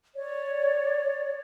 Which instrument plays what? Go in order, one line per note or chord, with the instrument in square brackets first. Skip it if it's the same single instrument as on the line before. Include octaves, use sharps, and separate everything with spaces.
[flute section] C#5 D5